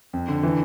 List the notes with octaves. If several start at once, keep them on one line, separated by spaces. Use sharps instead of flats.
F2
D3
E3